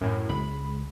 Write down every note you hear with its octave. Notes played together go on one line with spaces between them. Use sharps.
F#2 A2
C#2 G#3 B5